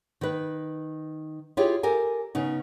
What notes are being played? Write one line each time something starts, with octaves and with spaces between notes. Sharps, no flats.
D#3 B4
E4 F4 G4 G#4 C#5
G4 A4 A#4 G#5
C#3 B3 C#4 D#4